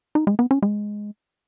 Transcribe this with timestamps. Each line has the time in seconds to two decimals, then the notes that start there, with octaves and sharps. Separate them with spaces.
0.15 D#4
0.27 G#3
0.39 B3
0.51 C#4
0.62 G#3